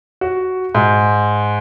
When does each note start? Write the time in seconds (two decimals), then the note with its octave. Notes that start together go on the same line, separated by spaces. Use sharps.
0.21 F#4
0.75 G#2